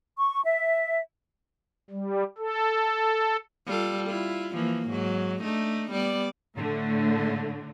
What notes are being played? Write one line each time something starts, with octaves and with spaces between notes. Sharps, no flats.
C#6
E5
G3
A4
G3 F4 A4
E4 F4
E3 F3 A#3
G#2 F#3
A3 D4 D#4
G3 B3 D5
A2 D3 A3